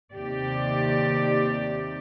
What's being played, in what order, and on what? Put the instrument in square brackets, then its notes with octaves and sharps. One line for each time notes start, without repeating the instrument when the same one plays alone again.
[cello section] D#2 C3 G4 D5